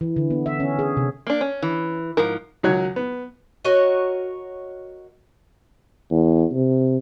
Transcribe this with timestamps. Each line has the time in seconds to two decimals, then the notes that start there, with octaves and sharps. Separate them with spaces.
0.01 E3
0.16 D3
0.30 B3
0.46 E5
0.60 C#4
0.79 G#4
0.97 C3
1.27 A#3 D4
1.41 C#4
1.62 E3
2.17 G#2 F3 A#4
2.63 C#2 D#3 F#3 F#4 C#5 F#6
2.96 B3
3.65 F#4 A#4 C#5 D#5
6.11 E2
6.53 C3